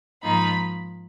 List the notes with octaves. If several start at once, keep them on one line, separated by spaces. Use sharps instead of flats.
G#2 F3 A#3 D#4 B5